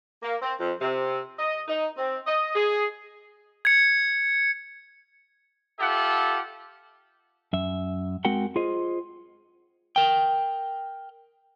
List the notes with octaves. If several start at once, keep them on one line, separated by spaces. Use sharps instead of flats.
A#3
C4
F2
C3
D#5
D#4
C4
D#5
G#4
G#6 C#7
F4 G4 A4 E5 F#5
F#2 E5
G#3 C4 F#4 A#4 F#5 G5
F4 G#4 C5 D#5
A#4 G5